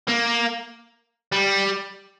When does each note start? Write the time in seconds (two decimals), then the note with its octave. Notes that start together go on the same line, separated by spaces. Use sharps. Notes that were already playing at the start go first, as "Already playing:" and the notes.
0.08 A#3
1.32 G3